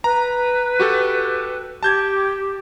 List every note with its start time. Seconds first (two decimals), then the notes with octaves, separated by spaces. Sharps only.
0.04 B4 A#5
0.80 F#4 G4 A4
1.83 G4 A5 G6 G#6